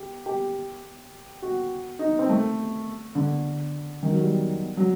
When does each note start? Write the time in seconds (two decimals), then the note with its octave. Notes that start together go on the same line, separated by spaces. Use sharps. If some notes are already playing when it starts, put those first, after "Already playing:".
Already playing: G4
0.26 G4
1.42 F#4
1.99 D#4
2.19 C4
2.29 A3
3.15 D3
4.03 D#3
4.12 F#3
4.21 G3
4.77 F#3